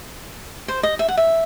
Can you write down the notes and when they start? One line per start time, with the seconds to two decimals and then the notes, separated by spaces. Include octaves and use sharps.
0.68 C5
0.83 D#5
0.99 E5
1.08 F#5
1.17 E5